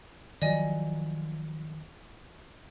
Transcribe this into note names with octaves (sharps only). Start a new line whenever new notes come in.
D#3 F3 F#3 D5 D#5 G#5